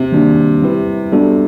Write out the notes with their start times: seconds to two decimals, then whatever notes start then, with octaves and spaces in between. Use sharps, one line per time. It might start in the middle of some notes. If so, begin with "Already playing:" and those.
Already playing: C3
0.12 D#3 G3 A#3 D4 F#4
0.62 G3 C4 E4 G4 B4
1.12 G3 B3 D4 F#4 A4